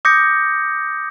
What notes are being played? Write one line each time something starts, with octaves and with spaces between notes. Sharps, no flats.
D6 D#6 G6 A#6 C#7